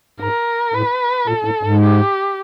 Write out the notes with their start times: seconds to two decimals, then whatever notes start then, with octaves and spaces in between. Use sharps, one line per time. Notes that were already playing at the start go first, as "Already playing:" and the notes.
0.20 G#2 A#4
0.74 A2 B4
1.27 A#2 A4
1.45 A2
1.63 G#2
1.80 G4